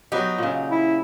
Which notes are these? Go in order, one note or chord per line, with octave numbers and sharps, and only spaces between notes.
F#3 B3 D#4 G4
A#2 C#3
E4